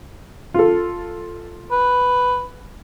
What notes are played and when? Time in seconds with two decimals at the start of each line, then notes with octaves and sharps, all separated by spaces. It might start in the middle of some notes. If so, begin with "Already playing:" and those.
0.54 F4 A4
1.71 B4